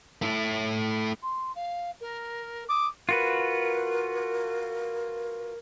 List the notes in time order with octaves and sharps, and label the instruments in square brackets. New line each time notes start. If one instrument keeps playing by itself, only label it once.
[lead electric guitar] A3 E4
[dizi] C6
F5
A#4
[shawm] D6 [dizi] D#6
[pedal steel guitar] F4 F#4 B4 [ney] A#4